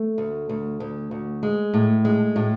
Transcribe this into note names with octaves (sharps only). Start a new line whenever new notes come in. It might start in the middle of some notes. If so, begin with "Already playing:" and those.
Already playing: A3
D2
D2
D2
D2
G#3
A2
G#3
A2